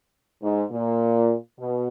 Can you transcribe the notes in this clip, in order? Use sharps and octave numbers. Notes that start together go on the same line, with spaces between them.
G#2
A#2
B2